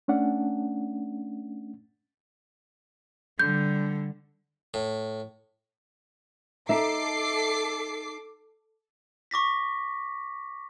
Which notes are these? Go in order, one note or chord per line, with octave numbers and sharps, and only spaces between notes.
A3 C#4 D4 F#5
D3 G3 G6
A2
D#4 A4 E5 D6 C7
C#6 D6 A#6 B6